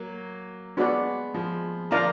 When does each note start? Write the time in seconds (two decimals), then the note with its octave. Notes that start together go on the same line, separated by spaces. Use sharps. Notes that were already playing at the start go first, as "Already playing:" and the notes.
Already playing: F#3 A#3
0.77 G#3 B3 D4 F#4 D5 F#5
1.34 F3 G#3
1.91 D3 F3 A#4 D5 F5 A#5